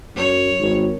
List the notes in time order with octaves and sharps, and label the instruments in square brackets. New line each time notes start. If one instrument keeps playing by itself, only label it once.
[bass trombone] F#2 [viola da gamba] C#5
[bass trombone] G#1